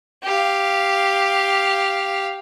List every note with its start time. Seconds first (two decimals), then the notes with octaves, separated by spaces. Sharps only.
0.23 G4 F5